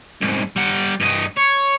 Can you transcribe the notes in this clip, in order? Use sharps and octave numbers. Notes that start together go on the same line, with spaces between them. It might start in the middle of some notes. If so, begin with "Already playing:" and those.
C2 G#2
G3 F#5
G2 D#5
C#5